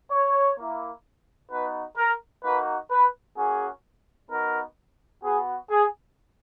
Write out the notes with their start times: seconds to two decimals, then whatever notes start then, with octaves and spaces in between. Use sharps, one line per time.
0.11 C#5
0.58 A#3 E4
1.51 B3 D#4 F#4 B4
1.97 A#4
2.44 A#3 D#4 F#4 B4
2.91 B4
3.37 A#3 C#4 F#4 G#4
4.30 B3 D#4 F#4 A#4
5.23 B3 F#4 G#4
5.70 G#4